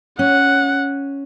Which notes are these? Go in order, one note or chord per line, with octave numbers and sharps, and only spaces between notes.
C#4 F#5